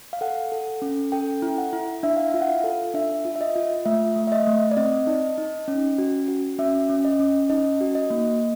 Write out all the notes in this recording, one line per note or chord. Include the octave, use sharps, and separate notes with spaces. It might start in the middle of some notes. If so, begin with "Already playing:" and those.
F5
A4 F#5
A4
C#4
A4 G5
E4
F#5
E4
D4 E5
F5
E5
F4
F#5
F5
A4
D4 E5
F4
E5
D#5
F4
A3 E5
A3
E5
D#5
A3
D5
C4 D#5
D#4
D#4
C#4
F#4
F#4
C#4 E5
C#4
D#5
C#4
D#4 D#5
F#4
D#5
A#3